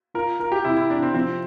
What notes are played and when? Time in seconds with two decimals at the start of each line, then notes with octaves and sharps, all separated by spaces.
0.14 F4 A#4
0.39 F4 A#4
0.52 G4
0.65 C3 E4
0.77 E4
0.90 C3 D4
1.03 C4
1.14 F3 C4